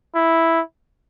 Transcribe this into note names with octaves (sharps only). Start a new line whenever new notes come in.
E4